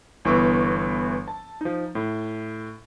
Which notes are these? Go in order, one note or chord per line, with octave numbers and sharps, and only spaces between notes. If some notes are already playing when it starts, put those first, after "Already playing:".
G1 E3 B3 C#6 D6 E6
A5
F3 D#4
A2